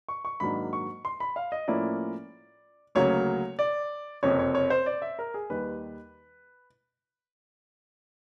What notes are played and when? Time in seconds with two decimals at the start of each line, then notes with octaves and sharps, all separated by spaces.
0.09 C#6
0.25 C#6
0.40 G#2 D#3 F#3 A#3 D4 B5
0.73 C#6
1.05 C6
1.20 B5
1.36 F5
1.52 D#5
1.68 A2 F3 A#3 C#4 E4 D5
2.95 D2 C#3 F#3 A#3 C#5
3.59 D5
4.23 F#1 F2 C3 C#5
4.39 C#5
4.55 C#5
4.70 C5
4.86 D5
5.02 E5
5.19 A#4
5.34 G#4
5.50 D#2 D#3 G3 B4